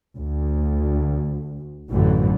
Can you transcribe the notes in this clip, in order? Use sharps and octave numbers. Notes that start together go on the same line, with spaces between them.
D2
A1 F#2 D3 E3